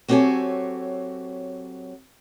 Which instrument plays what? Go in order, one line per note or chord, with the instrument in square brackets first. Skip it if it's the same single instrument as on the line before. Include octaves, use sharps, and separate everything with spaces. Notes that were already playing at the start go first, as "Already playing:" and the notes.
[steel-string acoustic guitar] F#3 C4 G4 A4 C#5 G#5